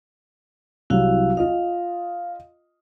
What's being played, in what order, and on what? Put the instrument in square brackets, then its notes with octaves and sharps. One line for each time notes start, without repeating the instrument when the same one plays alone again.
[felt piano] C2 F#3 G3 [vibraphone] E4 F#4 F5
[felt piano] F4 D#5 [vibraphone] F5